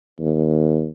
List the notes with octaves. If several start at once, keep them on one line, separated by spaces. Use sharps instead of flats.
D#2